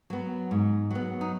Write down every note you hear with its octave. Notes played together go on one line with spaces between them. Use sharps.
F#3 B3
G#2
F#3 B3
D#4